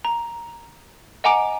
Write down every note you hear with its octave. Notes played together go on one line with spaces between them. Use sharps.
A#5
D#5 F#5 G#5 A#5 D6 D7